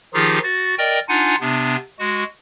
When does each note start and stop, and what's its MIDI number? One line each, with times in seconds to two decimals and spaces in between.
0.14 0.39 51
0.14 0.39 53
0.14 0.39 63
0.14 0.39 65
0.14 0.39 67
0.14 0.39 68
0.43 0.75 66
0.43 0.75 93
0.78 0.99 70
0.78 0.99 74
0.78 0.99 75
0.78 0.99 79
1.09 1.35 62
1.09 1.35 63
1.09 1.35 65
1.09 1.35 78
1.09 1.35 80
1.41 1.76 48
1.41 1.76 59
1.41 1.76 62
1.99 2.24 56
1.99 2.24 66